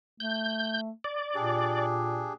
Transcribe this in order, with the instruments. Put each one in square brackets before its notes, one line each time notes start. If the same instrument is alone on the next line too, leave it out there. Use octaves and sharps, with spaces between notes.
[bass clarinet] A3 [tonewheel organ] G6
[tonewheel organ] D5
[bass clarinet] A#2 [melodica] D4 G4 G#4